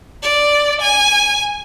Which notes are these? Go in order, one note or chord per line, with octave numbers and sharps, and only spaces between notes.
D5
G#5